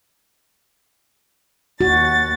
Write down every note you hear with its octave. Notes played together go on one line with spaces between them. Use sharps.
D#2 F#4 A6